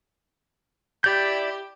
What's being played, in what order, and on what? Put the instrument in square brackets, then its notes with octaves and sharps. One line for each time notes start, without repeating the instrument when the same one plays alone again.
[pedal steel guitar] E4 D5 G6 [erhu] G4